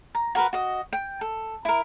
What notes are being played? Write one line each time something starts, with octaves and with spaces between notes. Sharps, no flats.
A#5
F#4 A#4 B4
F#4 D#5
G5
A4
E4 A#4